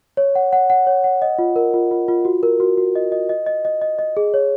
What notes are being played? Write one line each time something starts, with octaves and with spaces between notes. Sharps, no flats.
C#5
F#5
F#5
F#5
C#5
F#5
D#5
F4
A#4
F4
F4
F4
F#4
A#4
F#4
F#4
D#5
D#5
D#5
D#5
D#5
D#5
D#5
G#4
C#5